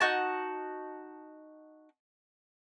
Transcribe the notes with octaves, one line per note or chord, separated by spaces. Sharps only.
D#4 F#4 A5